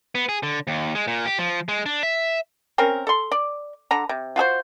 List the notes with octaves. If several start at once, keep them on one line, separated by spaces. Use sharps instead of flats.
B3
G#4
D3
D#2
G#3
A#2
G4
F3
G#3
D4
E5
C4 C#4 A#4
A4 C6
D5
D3 A#5
C3
F4 F#4 G#4 C5